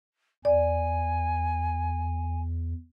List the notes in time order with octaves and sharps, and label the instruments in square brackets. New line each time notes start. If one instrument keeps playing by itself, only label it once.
[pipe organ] E2 [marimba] D5 [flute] G#5